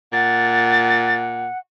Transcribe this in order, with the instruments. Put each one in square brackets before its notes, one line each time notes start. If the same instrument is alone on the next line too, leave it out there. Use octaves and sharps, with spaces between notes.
[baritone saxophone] A#2 [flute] F#5 [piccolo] A6